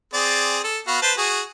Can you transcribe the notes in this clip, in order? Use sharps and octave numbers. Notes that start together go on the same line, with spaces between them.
C4 G#4 D5
A4
B3 F#4 F5
B4 C5 A5
F#4 G#4